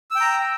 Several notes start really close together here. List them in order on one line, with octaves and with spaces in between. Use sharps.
E6 G5 A#5